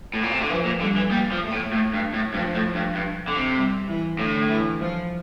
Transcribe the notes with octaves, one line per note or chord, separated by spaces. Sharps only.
A2
A#2
C3
D3
E3 F3
A#2
D3 G3
E3
G3 A#3
F3
A3
A2
A2
G2
A2
G2 F3
A2
G2
G2
D3
C3
G3
E3
A2 D3
E3
F3